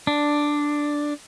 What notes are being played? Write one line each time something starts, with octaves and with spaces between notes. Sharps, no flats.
D4